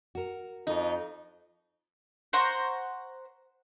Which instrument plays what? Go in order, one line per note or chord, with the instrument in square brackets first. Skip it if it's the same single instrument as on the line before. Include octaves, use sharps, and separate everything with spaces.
[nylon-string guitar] F#4 A#4
[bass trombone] F2 [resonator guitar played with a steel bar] D#4
[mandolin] C5 F#5 A#5 C#6